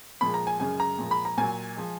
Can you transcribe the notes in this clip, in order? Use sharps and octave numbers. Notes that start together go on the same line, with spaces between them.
A#2 F3 G#3 B5
A#5
G#5
F#2 C#3 G#3 G#5
A#5
A#2 F3 G#3
B5
A#5
A#2 F#3 G#5
F3 G#3